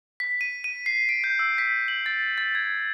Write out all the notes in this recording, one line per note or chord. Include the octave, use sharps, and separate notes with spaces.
B6
D#7
D#7
C7
D7
G6
E6
B6
F#7
A6
A6
G#6